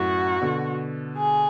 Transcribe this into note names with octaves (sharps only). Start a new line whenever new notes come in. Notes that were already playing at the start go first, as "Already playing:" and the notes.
Already playing: F#2 A2 F#4
B2 D3
G#4